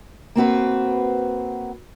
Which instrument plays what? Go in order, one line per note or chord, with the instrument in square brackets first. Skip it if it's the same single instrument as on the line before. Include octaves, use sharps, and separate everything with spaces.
[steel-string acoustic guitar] A#3 C4 F#4 B4